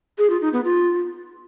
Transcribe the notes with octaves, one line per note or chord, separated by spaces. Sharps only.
G#4
F4
D#4
B3
F4